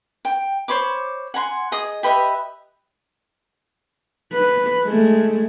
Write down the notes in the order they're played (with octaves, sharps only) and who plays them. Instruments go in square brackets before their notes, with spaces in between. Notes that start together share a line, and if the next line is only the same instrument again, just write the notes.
[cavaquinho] G5
C5 C#5 B5 D6
F#5 G#5 A#5 C6
G#4 D#5 D#6
G4 B4 D#5 E5
[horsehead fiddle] B4
G#3 A3